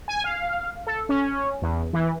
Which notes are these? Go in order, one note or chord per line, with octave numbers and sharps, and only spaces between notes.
G#5
F5
A4
C#4
E2
E3